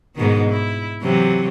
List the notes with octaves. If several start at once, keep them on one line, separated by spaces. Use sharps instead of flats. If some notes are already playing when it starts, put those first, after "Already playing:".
G#2 B2 D#3
E4
C3 E3 F#3